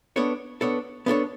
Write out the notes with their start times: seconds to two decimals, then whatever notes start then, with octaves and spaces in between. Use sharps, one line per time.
0.16 B3 D4 A4 C#5
0.61 B3 D4 A4 C#5
1.06 B3 D4 A4 C#5